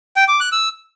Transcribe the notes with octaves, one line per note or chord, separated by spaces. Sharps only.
G5
D6
F#6
E6